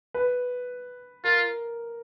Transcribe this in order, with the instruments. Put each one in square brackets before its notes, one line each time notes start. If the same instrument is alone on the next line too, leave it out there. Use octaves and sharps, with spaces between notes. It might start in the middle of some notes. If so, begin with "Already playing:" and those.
[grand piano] B4
[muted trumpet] F4 [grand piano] A#4